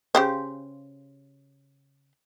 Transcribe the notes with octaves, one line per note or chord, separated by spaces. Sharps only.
C#3 G4 C5